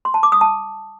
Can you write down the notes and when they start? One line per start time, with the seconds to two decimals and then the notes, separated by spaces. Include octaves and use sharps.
0.05 C6
0.14 A5
0.23 D6
0.32 D#6
0.41 A5